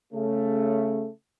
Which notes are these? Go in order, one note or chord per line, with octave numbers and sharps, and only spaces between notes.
C#3 A3